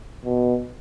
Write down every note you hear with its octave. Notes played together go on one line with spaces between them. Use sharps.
B2